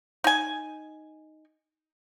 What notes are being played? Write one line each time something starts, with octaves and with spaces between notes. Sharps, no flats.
D#4 G#5